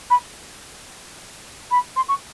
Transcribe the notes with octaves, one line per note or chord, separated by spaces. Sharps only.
B5
B5
C6
C#6